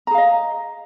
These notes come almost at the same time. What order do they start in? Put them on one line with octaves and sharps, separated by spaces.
A#5 G#4 F5 D#5